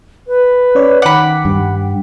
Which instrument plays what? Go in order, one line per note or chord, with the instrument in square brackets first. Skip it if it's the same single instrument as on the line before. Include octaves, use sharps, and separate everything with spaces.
[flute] B4
[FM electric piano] C#4 C#5 D5
[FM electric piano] D#3 D6 [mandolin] F#5 B5 [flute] G5
[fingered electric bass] G2